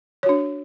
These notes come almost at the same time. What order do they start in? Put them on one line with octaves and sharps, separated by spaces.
C#5 F#4 D4